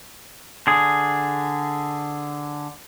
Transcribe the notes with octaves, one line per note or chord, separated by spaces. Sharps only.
D3 G#4